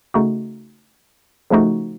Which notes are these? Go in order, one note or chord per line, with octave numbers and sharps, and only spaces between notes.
C#3 A3 D#4 F#4
C#3 F3 A3 D#4 F#4